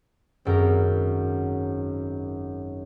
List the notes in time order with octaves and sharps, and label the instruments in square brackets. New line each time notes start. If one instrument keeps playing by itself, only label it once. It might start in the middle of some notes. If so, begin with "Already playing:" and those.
[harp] G#1 F#2 C#4 A#4